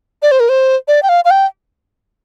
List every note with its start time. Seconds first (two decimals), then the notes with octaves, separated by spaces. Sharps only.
0.22 D5
0.31 C5
0.40 A#4
0.49 C5
0.88 D5
1.03 G5
1.09 F5
1.25 F5
1.31 G5